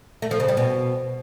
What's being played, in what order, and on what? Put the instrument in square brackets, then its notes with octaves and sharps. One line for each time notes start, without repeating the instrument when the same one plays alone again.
[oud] A3
F3
C#3
G3
B2